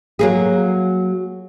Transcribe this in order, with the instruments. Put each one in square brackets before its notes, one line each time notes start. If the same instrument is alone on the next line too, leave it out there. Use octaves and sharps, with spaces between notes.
[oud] F#3 A#3 G#4